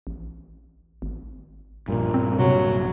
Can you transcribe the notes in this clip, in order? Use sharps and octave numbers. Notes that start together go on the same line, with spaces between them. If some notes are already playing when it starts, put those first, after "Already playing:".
A1
G#1
A#1 G2 A#2
C4
C3 F#3